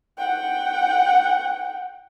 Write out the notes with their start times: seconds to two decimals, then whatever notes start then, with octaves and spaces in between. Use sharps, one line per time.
0.18 F#5 G5